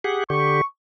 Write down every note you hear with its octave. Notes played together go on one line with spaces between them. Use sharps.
G4 G#4 F#5
D3 G4 C#6